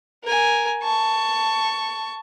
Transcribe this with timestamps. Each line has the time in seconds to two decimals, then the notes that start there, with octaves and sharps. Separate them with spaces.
0.24 A#4 G#5
0.83 A5 C#6